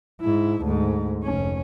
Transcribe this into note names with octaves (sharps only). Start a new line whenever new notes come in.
G#2 E4
D2 G#2
F1 C#4